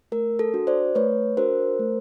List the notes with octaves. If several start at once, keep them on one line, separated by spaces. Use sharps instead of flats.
A3 A#4
A4
D4 F#4
C5 D5
A3 B4 C#5
D4 F#4 A#4 C5
A3